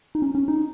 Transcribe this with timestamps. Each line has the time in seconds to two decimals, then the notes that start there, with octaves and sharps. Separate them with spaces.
0.15 D#4
0.22 C#4
0.35 C#4
0.48 D#4